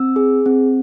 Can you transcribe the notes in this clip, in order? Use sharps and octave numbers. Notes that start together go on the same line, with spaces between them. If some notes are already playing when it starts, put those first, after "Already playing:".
Already playing: C4 E6
G#4
C4